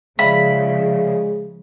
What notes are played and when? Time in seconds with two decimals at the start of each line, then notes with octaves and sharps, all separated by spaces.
0.19 C#3 F3 G#3 D5 E5 F5 B5